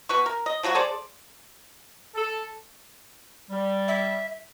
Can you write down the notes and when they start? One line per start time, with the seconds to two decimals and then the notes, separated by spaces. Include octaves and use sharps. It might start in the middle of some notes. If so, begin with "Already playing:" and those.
0.09 B2 B4 C#6
0.26 A#4
0.46 D#5
0.63 F3 F#3 G#3 F#4
0.75 G#4 A4 C5 D5
2.15 A4
3.49 G3
3.88 E5